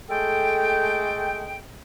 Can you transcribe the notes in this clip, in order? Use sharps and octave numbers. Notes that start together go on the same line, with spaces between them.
G#3 A3 A4 G5